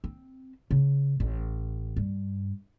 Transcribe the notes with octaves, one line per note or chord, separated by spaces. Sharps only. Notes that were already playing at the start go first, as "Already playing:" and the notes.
C4
C#3
A1
G2